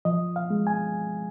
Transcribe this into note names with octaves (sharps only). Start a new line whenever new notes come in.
F3 D#5
F5
G#3
G#5